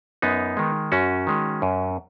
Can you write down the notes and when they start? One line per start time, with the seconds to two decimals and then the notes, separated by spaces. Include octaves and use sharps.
0.22 F#2 B3 D#4
0.57 D#3 G#3
0.92 F#2 C#4 F#4
1.27 D#3 G#3
1.62 F#2